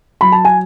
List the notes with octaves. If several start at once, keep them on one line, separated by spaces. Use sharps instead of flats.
F#3 B5
A5
G#5